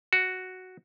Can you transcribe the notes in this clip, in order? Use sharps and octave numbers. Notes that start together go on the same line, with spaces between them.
F#4